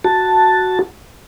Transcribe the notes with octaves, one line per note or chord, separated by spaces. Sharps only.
F#4 A5